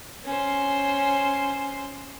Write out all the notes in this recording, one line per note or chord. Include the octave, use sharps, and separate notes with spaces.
C#4 C5